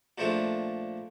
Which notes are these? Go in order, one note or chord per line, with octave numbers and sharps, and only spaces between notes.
A#2 F3 A3 D4